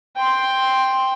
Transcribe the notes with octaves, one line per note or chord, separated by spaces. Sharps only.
G5 C6